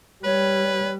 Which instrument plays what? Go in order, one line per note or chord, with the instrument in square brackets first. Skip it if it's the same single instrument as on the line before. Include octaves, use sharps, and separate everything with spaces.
[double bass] G3 [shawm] B4 [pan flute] C#5